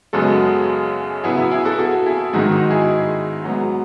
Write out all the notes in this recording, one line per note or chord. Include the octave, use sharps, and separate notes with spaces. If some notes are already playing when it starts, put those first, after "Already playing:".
F#2 C#3 G#3 B3 F#4 A4
C#3 F#3 B3 E4 G#4
E4
E4 G#4
F#4 A4
F#4 A4
E4 G#4
G#2 D#3 G#3 D#4 F#4
D#4 F#4
E4 G#4
G#2 F#3 B3